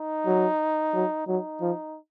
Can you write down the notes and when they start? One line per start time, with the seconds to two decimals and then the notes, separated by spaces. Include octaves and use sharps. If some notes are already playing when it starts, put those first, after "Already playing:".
Already playing: D#4
0.26 F#3
0.94 F#3
1.27 F#3 D#4
1.61 F3